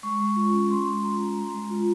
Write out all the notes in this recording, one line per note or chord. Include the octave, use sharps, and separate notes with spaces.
G#3 C#6
G#3
F4
C#4
G#3 C6
G#3
F4 A#5
C#4
G#3
G#3
F4